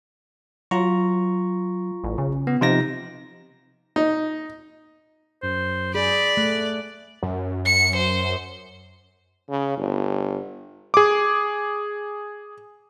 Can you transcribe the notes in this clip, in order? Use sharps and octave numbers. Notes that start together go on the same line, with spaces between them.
F#3 F4 A#5 C#6
A1
C#3
B3
C3 F3 D#4 A#6
D#4
F#2 C5
G#4 D5 B5
A3 F#6
F#2
C#7
C5
C#3
G1
G#4 D6